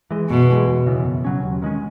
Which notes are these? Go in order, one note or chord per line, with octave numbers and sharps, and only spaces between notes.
E3 G#3
F#2 B2
E3 G#3
E2
C#3 E3 B3
F#2
C#3 F#3 C#4
D#2
D#3 G#3 C#4